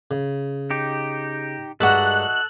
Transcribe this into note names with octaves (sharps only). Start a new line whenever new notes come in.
C#3
D#4 G4
G2 G#3 F#4 A4 D#5 E5 A#5 F#6